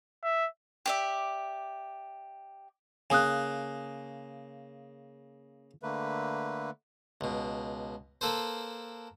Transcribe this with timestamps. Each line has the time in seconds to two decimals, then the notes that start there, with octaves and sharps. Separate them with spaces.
0.23 E5
0.86 G4 D5 E5
3.10 C#3 A#3 G#5 D#6 F#6
5.83 D3 A3 A#3 B4
7.21 C#2 B2
8.21 A#3 A4 B4 C5